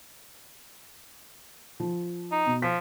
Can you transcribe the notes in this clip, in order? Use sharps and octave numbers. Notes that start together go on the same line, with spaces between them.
F3
D#4
B2
F3 B6